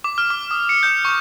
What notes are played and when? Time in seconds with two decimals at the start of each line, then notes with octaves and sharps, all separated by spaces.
0.04 D6
0.18 F6
0.30 D6
0.51 D#6
0.69 C#7
0.83 G6
1.05 C#6